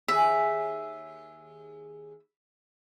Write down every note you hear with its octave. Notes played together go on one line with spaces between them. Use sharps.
D#2 G#4 E5